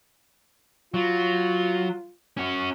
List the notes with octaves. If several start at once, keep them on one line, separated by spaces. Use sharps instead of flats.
F#3 F4
C#4 F#4